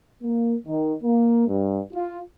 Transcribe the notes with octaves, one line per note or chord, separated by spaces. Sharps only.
A#3
D#3
A#3
G2
F4